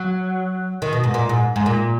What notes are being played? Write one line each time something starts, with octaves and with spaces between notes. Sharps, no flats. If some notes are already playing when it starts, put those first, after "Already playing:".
Already playing: F#3
D#3
B2
G#2
A#2
G#2
G#2
A#2